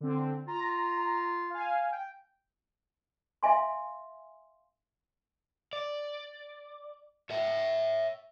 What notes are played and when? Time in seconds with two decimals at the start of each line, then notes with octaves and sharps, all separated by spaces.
0.01 D3 C4
0.48 F4 A#5
1.50 F5 G#5
1.92 G5
3.43 E5 F5 G#5 C6
5.73 D5
7.30 C#5 E5